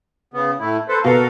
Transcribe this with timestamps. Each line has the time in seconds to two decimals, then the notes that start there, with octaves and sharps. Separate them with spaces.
0.34 C#3 B3
0.60 A2 A3 E4
0.88 A4 B4 C5
1.04 B2 A4 A#4 F5